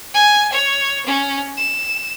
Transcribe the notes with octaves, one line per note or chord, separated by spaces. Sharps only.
G#5
C#5
C#4
E7